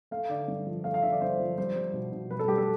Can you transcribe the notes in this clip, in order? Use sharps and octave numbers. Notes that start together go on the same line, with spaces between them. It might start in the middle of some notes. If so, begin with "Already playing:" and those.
A3 F5
D3 D5
G2
F3
A3 F5
F5
D3 E5
D5
G2 C5
F3
G3 C5
G3
B2
B2
G3 B4
A4
G3 G4
A4